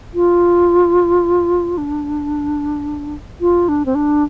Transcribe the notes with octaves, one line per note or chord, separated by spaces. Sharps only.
F4
D4
F4
D4
C4
D4